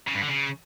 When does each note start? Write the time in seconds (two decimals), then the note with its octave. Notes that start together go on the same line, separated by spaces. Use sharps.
0.07 C#3
0.14 G2
0.21 D3
0.28 C#3